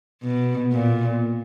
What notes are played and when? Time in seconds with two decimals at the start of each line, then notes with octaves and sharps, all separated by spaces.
0.23 B2
0.72 A#2